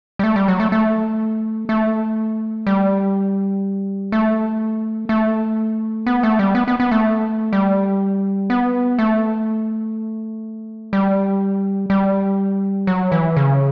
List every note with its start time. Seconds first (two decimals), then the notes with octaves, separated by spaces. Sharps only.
0.19 G3
0.24 A3
0.36 G3
0.48 F#3
0.60 A3
0.72 A3
1.69 A3
2.67 G3
4.12 A3
5.09 A3
6.06 B3
6.23 A3
6.39 G3
6.55 B3
6.68 B3
6.80 B3
6.91 A3
7.53 G3
8.50 B3
8.99 A3
10.93 G3
11.90 G3
12.87 F#3
13.12 E3
13.36 C#3